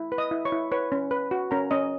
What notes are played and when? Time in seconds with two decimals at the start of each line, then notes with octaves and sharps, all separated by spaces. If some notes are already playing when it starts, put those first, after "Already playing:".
Already playing: E4
0.12 B4
0.18 D#5 D#6
0.31 E4
0.45 C#5 C#6
0.52 E4
0.72 B4 C#5 C#6
0.92 C#4
1.11 B4
1.31 F#4
1.51 C#4 A#4 A#5
1.71 C#4 D#5